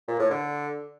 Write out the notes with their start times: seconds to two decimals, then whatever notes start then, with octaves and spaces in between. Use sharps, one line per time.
0.08 A#2
0.19 A2
0.31 D3